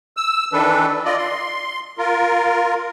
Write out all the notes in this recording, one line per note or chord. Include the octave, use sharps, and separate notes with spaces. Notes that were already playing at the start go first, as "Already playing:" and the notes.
E6
D#3 E3 D4 A4 B4
F4 D5 D#5
C6
F4 A#4